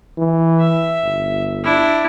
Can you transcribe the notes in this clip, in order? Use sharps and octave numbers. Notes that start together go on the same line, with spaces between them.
E3
E5
G1
D4 E4